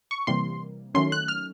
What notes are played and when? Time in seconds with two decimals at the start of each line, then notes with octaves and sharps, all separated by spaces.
0.11 C#6
0.27 C3 E3 G3 A#3 C6
0.95 D#3 F#3 A3 C#4 C6
1.12 F#6
1.28 F6